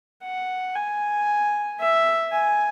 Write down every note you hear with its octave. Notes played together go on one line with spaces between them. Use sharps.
F#5
G#5
E5
G#5